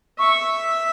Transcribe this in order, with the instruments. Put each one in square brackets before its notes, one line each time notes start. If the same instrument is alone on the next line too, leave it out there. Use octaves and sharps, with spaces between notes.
[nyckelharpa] E5 [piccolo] C#6